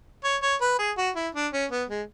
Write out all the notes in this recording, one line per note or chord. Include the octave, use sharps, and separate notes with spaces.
C#5
C#5
B4
G#4
F#4
E4
D4
C#4
B3
G#3